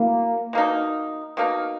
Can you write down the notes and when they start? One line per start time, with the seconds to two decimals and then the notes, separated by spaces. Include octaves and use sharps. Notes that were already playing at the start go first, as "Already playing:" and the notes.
Already playing: F#3 A#3 E4
0.53 B2 A#3 D#4
1.37 B2 A#3 D#4